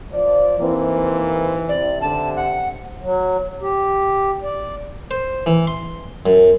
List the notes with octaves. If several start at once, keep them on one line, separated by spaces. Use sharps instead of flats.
F3 D5
D#2 E3 A#3 C4
C3 D5
D3 A5
F#5
F#3
G4
D5
C5
E3
C6
F#2